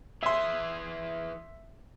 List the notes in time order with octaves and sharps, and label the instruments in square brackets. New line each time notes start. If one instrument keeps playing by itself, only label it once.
[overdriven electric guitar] E3 G#4 [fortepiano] E5 C6